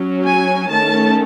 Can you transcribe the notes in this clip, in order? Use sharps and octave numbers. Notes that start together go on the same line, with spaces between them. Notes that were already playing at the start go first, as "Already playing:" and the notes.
Already playing: F#3 C#4
G#5
D#3 A3 C#4 A5